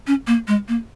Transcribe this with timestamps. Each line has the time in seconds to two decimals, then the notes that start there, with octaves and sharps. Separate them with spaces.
0.07 C#4
0.27 A#3
0.48 G#3
0.68 A#3